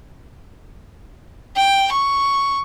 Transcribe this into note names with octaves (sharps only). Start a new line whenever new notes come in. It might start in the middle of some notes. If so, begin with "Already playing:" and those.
G5
C#6